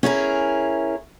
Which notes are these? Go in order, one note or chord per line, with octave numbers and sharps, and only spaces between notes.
C#4 E4 G#4 A#4